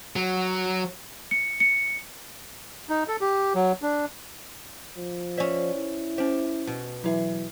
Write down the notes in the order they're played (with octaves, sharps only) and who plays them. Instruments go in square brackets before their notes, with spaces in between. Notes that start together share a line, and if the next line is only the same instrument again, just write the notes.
[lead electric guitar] F#3
[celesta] C#7
C#7
[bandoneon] D#4
A4
G4
F#3
D4
[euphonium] F3
[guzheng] C#4 E5 [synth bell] C5 D5
[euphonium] E4
[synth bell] C#4 C5 [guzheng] G4
[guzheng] B2
[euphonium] E3 [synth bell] F#3 E4 E5